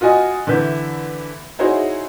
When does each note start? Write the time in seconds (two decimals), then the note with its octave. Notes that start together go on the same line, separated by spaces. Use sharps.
0.01 F4 F#4 D#5 G#5 D#6
0.47 D3 E3 B4 E5 G6
1.59 D#4 E4 F#4 G#4 C5 C#5